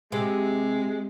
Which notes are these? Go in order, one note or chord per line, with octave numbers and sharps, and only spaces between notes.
C3 G#3